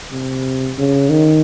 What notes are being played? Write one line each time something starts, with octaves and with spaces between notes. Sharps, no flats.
C3
C#3
D#3